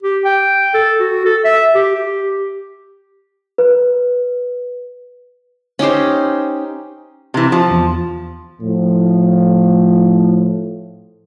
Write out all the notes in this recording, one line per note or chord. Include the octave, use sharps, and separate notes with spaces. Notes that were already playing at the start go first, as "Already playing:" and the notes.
G4
G5
A4
F#4
A4
E5
G4
G4
B4
C#4 D#4 G4 C5
C3 E3
F3
E2
A2 F3